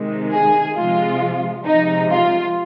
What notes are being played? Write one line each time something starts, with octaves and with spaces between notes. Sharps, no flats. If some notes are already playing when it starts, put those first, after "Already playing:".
Already playing: C3 D#3 G#3
G#4
C3 F3 G#3 F4
C3 F3 G#3 D#4
F4